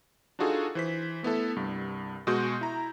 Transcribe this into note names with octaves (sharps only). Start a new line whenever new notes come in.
D4 D#4 F4 F#4 G#4 A4
E3 C5 B6
A3 B3 E4 A4
C2 G2
B2 G#3 F#4 C6 G6
E4 A#5